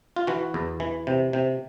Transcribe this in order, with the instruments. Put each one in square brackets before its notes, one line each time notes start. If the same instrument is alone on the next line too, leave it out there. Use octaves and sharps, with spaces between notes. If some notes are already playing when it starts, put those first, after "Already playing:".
[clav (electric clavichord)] F4
E3 F#4
E2
E3
C3
C3